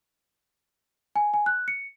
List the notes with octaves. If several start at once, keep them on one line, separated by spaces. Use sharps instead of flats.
G#5
G#5
F#6
C#7